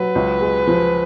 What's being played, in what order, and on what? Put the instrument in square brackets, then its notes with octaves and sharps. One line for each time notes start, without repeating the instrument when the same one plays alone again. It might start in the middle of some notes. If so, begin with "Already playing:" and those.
Already playing: [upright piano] F#3 [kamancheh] B4
[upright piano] C#2
G#3
F3